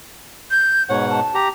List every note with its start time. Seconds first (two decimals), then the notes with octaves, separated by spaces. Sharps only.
0.51 G6
0.89 G#2 B2 C#5 F#5
1.10 A5
1.34 G4 A#5